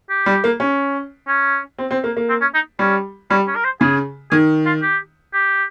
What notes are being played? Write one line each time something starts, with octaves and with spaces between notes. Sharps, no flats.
G4
G3
A#3
C#4
C#4
C4
C4
A#3
A#3
C4
C#4
D#4
G3 C#4
G3 C#4
C#4
A#4
C5
C#3 G#4
D#3 G#4
F4
G4
G4